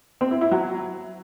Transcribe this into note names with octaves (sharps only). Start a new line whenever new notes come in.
C4
E4
E4
F#3